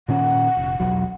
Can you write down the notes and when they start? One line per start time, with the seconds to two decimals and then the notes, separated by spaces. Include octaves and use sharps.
0.08 A#2 D#3 C#4 F#5
0.57 F1
0.80 E1 B1 F#3